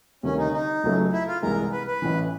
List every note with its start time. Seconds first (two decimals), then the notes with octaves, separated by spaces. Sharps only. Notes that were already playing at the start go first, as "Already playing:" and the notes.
0.23 D2 C3 D#3 G3 C#4
0.38 D#4
0.53 D#4
0.84 C#2 C#3 F#3 A3
1.13 E4
1.28 F4
1.42 C2 C3 E3 G#3 A#4
1.72 B4
1.87 B4
2.02 A1 A2 E3